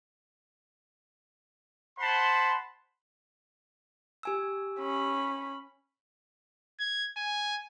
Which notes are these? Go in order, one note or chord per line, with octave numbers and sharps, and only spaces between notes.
C5 F#5 A5 B5 C6
G4 G#5 E6
C#4 B5
G#6
G#5